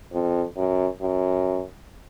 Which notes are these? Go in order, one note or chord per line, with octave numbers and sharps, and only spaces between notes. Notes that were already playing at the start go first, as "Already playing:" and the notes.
F2
F#2
F#2